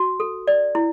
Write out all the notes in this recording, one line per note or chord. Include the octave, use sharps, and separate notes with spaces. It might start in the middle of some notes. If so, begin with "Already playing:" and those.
Already playing: F#4
A4
D5
E4